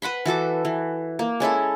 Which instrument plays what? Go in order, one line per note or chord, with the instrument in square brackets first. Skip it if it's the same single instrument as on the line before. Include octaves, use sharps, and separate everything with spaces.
[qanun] B4 F#5 B5 C6
E3 F#4 A4 D6
E3
A#3
G#3 C#4 E4 A4